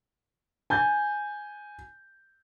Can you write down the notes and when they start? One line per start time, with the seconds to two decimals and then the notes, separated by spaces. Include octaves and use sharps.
0.70 G#5 G6 A6